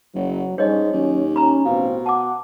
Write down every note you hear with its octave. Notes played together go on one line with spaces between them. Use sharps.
F#1 F#3
G#2 G3 C#4 D4 C#5 D#5
D#2 F#3 C#4
C#4 A#5 B5
A1 B2 C4 F5
F#5 A5 D6